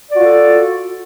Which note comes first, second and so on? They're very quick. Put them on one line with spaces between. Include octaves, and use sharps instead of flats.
D5 F#4 F4 A4